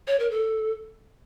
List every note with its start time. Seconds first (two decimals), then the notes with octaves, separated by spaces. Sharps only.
0.07 C#5
0.19 A#4
0.31 A4